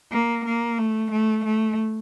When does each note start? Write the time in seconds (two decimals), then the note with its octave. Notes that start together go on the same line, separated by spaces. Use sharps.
0.12 A#3
0.46 A#3
0.78 A3
1.12 A3
1.45 A3